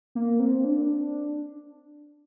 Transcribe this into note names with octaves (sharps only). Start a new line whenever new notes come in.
A#3
C4
D4